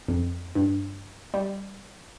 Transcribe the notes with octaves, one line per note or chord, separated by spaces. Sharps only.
F2
G2
G3